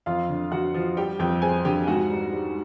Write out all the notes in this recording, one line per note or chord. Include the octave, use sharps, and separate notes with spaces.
F2 F4 F5
D3
D3 F#4 F#5
F3
G3 G4 G5
F2 G4 G5
C4 G#4 G#5
D3 G4 G5
G#2 F#4 F#5
G3
G3